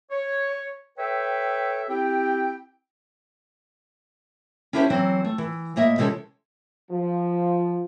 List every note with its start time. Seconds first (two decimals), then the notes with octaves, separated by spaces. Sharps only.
0.11 C#5
0.98 A4 B4 C#5 E5 G5
1.89 C4 E4 G4 G5
4.73 C#4 D4 E4 G4 A#4 C5
4.90 E3 F#3 C4
5.25 A3
5.38 E3
5.76 A2 A#3 D#5 E5
5.98 C3 E3 G#3 C#4 A4
6.91 F3